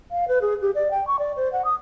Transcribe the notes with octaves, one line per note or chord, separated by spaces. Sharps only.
F5
B4
G#4
G4
D5
G5
C#6
D5
C5
F#5
D#6